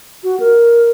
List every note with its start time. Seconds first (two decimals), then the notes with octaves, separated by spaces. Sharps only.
0.24 F#4
0.40 A#4